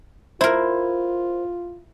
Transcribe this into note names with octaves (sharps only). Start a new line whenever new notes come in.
E4 F4 A#4 C5